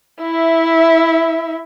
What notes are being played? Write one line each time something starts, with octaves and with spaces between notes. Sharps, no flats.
E4 E5